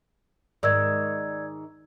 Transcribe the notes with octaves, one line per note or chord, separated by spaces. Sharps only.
G#2 D#3 D5 E6 G#6